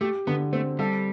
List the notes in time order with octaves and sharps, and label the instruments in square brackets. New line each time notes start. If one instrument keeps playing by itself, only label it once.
[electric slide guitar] A3 [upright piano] G4
[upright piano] D3 [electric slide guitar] B3
[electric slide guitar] A3 [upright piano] C4
[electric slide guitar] G3 [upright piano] A4